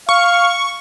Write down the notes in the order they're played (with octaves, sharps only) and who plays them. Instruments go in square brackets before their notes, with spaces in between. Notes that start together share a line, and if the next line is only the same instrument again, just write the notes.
[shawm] F5 [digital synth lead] C#6